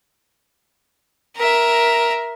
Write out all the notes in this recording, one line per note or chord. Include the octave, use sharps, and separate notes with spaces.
A#4 E5